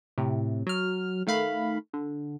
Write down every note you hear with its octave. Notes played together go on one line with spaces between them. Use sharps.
A2 C3
F#3 F6
D#3 A3 F5 B5
D3